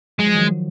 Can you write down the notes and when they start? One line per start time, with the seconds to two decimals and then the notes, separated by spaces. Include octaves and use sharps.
0.19 F#3 G#3
0.27 F3
0.34 D#3 F#3